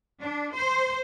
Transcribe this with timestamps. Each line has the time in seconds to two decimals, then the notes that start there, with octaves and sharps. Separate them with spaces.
0.21 D4
0.55 C5